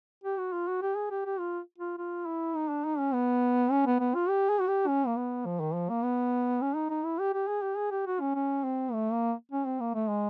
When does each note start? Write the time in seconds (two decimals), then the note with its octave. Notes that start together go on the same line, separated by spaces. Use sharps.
0.24 G4
0.39 F#4
0.53 F4
0.68 F#4
0.82 G4
0.96 G#4
1.11 G4
1.25 G4
1.39 F4
1.78 F4
1.98 F4
2.26 E4
2.55 D#4
2.70 D4
2.85 D#4
2.99 C#4
3.13 B3
3.71 C#4
3.86 B3
4.00 B3
4.15 F4
4.29 G4
4.49 G#4
4.60 F#4
4.68 G4
4.87 C#4
5.07 A#3
5.16 B3
5.45 F3
5.60 D#3
5.74 F3
5.89 A#3
6.03 B3
6.62 C#4
6.76 D#4
6.90 D#4
7.05 E4
7.19 G4
7.34 G4
7.48 G#4
7.62 G4
7.77 G#4
7.91 G4
8.07 F#4
8.20 C#4
8.35 C#4
8.64 C4
8.92 A3
9.12 A#3
9.52 C#4
9.65 C4
9.80 A#3
9.94 A3
10.09 G#3